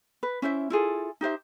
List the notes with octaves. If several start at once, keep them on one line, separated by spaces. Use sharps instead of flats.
B4
C#4 E4 C5 E5
E4 F4 G#4 A4
D#4 G4 C5 E5